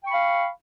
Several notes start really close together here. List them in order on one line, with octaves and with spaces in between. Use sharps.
G5 C#6 B5 F5